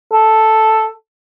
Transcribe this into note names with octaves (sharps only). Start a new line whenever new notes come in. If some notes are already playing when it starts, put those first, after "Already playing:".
A4